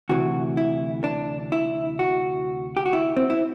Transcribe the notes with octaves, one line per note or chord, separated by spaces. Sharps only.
D2 C3 E3 F#4
E4
D4
E4
F#4
G4
F#4
E4
C4
E4